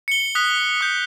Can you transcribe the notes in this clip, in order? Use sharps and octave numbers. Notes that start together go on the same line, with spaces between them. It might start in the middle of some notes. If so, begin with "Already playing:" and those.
C#7 G7
D#6 F#6 B6
D#6 G6